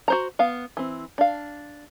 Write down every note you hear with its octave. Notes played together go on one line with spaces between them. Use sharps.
F#4 C5 A#5
B3 F5
E3 C4
D4 F5